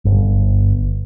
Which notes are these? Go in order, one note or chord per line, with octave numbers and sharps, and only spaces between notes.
G1